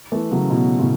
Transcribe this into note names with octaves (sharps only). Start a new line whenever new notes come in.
E3 A3
C#3 F#3
B2 E3
A2 C#3